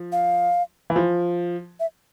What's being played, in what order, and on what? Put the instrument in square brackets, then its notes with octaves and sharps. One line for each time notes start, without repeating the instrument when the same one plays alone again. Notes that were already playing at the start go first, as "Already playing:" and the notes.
Already playing: [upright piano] F3
[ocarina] F5
[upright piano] E3
F3
[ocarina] E5